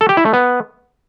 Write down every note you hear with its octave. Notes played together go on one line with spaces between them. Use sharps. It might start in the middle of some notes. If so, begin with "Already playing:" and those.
A4
G4
E4
A3
B3